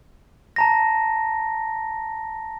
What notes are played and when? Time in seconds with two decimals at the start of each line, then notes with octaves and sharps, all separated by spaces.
0.56 A5 A#5 A#6